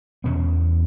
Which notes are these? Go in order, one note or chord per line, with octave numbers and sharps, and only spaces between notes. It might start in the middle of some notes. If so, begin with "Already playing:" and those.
E2 B2 B3 C#4